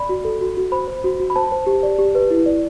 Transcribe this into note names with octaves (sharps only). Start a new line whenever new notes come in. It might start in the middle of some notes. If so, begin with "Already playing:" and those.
Already playing: D5 B5
F#4
A4
F#4
F#4
C5 B5
C5
F#4
F#4
B5
C5 A5
C5
G4
D5
G4
B4
E4
D5